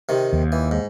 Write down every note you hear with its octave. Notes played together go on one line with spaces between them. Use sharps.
C3 D#3
D#2
E3
G#2